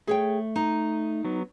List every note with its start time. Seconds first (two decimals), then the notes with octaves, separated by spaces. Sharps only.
0.07 A3 G#4 C#5 G5
0.56 D#4
1.25 F#3 B3